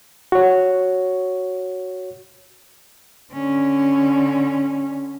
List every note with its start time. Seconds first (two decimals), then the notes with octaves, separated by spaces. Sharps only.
0.32 F#4 C#5
3.32 D3 C#4